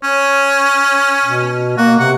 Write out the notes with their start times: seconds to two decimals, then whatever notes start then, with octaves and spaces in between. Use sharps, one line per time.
0.03 C#4 C#5
1.25 B2
1.78 A#3 F#4
2.00 C3 F#5